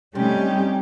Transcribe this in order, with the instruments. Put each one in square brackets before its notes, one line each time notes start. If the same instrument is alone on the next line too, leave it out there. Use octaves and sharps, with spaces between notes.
[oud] C3 [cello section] G3 A3 D#4 [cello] C#4 G4